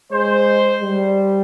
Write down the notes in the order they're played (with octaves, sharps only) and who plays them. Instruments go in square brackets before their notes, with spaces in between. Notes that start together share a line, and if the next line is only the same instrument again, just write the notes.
[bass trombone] G#3 [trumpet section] C5
[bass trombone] G3